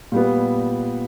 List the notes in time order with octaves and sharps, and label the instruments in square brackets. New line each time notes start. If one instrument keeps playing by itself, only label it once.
[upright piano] A#2 G3 B3